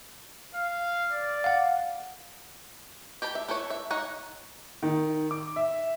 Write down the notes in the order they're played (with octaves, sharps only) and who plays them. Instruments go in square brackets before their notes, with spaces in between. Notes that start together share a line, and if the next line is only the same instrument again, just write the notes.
[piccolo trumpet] F5
D5
[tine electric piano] F5 F#5
[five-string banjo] G4 G5 A5 B5
E5
E4 A4 B4 C#5
E5
D#4 C#5 F#5
[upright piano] D#3
D6
E5